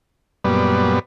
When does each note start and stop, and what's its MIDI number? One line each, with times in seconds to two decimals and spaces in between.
0.44 0.99 42
0.44 0.99 46
0.44 0.99 55
0.44 0.99 59
0.44 0.99 71
0.44 0.99 74